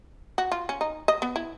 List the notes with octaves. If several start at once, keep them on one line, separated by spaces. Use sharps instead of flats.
F#4
F4
C#4
D#4
D#5
B3
E4